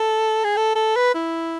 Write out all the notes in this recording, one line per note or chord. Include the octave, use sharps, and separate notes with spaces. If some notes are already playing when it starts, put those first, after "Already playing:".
Already playing: A4
G#4
A4
A4
B4
E4